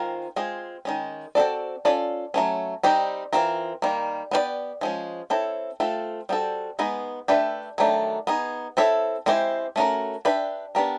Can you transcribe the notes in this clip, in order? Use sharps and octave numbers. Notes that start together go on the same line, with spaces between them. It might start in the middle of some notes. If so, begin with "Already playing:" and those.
Already playing: D#3 G#3 C4 F4 A#4
G#3 C4 F4 G#4
D#3 G#3 C#4
C4 D#4 F#4 A4 D5
C#4 F4 A4 D5
F#3 A3 C#4
G3 C4 D#4 G4
E3 A3 C4 F4 A#4
D#3 G3 A#3
B3 D4 G4 B4 D5
F3 G#3 C#4
C4 E4 A4 C#5
A3 C4 F4 A4
G3 C4 D#4 F#4 A4
G#3 B3 D#4 G#4 B4
A3 D4 G4 B4 E5
D#3 F#3 A3 D4 G4
B3 D#4 G#4
C4 E4 A4 C#5 E5
G#3 C4 E4 G4 C5
A3 C#4 F#4 A#4
D4 G4 B4 E5
B3 D4 G4 A#4